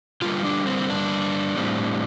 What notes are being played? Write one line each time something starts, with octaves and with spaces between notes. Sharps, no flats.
D3 G3 A#3 F4
D4
C4
D4
A2 G3 C4